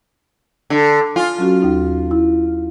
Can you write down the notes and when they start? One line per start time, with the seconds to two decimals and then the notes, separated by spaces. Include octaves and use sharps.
0.70 D3
1.16 F4 G#5
1.38 F#3 C#4 F#4
1.62 D#2 D#4
2.11 E4